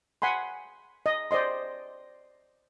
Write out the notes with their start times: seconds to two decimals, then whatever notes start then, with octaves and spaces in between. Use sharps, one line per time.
0.22 F#5 G#5 B5 C6
1.06 D#5
1.31 C5 D5 D#5 C6